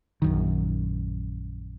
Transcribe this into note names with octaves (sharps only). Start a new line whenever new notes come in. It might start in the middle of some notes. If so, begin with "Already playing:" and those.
A#1 F#2 D#3